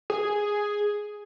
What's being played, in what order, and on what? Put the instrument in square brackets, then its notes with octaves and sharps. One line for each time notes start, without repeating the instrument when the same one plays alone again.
[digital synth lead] G#4